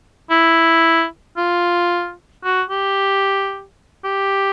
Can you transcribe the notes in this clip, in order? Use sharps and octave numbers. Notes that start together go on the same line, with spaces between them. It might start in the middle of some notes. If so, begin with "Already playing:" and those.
E4
F4
F#4
G4
G4